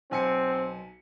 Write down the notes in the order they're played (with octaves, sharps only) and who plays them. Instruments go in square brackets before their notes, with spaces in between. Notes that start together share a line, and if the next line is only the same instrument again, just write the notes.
[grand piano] B1 G#5 C#7 [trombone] C4